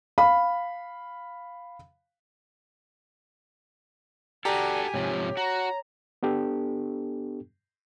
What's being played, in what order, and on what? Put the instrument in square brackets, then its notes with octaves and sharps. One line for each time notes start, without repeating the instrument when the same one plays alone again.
[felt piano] F5 B5
[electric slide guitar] F#4 A4 [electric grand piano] G4 A#5 [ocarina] D5 [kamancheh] G#5
[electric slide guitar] G#2 C3 F3 [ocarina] C#5
[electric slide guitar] F#4 [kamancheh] A#5
[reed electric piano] B3 D4 G4 A4